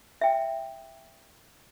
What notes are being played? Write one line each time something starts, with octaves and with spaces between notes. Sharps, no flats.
E5 G5